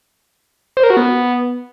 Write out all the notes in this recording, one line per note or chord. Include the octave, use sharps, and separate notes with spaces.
C5
A#4
F#4
B3